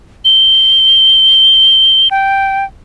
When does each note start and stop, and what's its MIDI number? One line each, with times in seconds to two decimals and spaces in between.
0.25 2.08 103
2.11 2.65 79